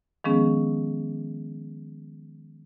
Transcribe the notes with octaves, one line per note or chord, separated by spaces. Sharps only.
D#3 F3 G#3 B3 C#4 G#4